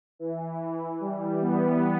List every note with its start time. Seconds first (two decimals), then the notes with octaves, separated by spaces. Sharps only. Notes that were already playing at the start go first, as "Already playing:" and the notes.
0.19 E3
1.00 G3
1.41 B3